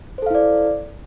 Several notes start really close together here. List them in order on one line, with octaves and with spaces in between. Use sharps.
C5 A4 F5 E4 D5